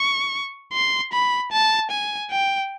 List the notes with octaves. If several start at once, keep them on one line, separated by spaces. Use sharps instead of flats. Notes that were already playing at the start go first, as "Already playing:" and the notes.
Already playing: C#6
C6
B5
A5
G#5
G5